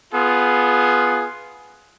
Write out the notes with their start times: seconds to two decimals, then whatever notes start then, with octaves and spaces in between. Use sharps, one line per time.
0.14 B3 F4 G#4